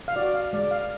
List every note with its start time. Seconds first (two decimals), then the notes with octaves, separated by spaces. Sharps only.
0.08 F5
0.16 F#4 D5
0.34 F5
0.53 G#3 D5
0.71 F5